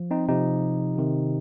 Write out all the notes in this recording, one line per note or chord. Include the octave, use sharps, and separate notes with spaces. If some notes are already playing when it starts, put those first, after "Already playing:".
Already playing: F3
C4 D#4
C3 F3 D#4 G4
C3 D#3